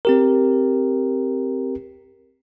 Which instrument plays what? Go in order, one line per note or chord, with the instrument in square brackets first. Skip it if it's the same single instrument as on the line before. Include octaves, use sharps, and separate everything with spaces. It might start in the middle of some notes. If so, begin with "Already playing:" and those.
[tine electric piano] C4 G4 A#4